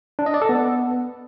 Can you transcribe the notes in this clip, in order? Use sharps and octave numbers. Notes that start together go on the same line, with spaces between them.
D4
D#5
D5
A4
B3